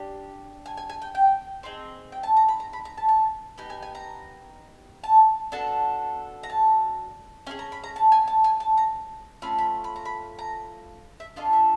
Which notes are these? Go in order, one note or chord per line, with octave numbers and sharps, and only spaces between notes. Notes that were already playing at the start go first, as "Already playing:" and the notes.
Already playing: D4 G4
G#5
G#5
G#5
G5
G5
C4 D#4 G#4
G5
A5
A#5
B5
A#5
B5
A#5
A5
A5
B3 D#4 G4 G#5
G#5
G#5
A#5
A5
B3 D4 F#4 A4 A5
A#5
A5
C#4 F4 G#4 G#5
A#5
B5
A#5
A5
G#5
A5
G#5
A5
A#5
A3 C#4 F4 B5
B5
B5
A#5
B5
A#5
E5
D4 F4 A4 D#5
E5